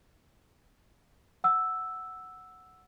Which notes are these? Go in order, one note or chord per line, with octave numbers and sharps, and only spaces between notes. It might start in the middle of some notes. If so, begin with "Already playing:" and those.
F#5 E6